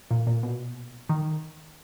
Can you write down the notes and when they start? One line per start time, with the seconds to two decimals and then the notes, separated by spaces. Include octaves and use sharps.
0.11 A#2
0.27 A#2
0.43 B2
1.09 D#3